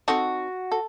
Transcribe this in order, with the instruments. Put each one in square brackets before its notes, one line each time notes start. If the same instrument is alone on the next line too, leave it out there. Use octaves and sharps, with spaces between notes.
[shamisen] C4 D#4 A4 [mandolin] F#4
[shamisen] A4